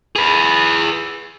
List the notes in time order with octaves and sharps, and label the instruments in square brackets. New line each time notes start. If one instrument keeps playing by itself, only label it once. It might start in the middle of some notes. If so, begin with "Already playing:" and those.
[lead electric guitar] G#4 B4